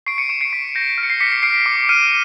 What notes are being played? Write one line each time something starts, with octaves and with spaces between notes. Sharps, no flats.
C#6 C7 D7
C#7 D#7
C#6 D7 E7
C7 D7
C#6 B6
G6 A#6
F6
C#7
C7
D6 B6 C#7
C7
F6 C7 D7
D6
F6 C#7 D#7